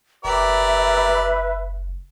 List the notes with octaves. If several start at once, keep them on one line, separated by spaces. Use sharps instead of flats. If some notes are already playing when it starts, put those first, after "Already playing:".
F#1 G4 A#4 B4 D5 E5